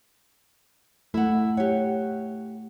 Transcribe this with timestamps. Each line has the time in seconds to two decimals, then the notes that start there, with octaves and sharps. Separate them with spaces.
1.14 A3 E4 F#5
1.57 G4 C#5 F#5